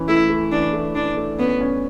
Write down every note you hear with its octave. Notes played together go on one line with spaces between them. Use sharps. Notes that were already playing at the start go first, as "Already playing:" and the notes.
Already playing: E3 C#4
A3 E4
A3
E3 D4
A3
E3 D4
A3
B3 C#4
C#4